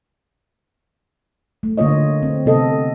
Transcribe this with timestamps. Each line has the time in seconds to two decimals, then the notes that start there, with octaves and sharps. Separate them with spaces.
1.63 A3
1.78 D3 A#3 F4 C#5 D#5
2.23 C4
2.46 C3 B3 A4 D#5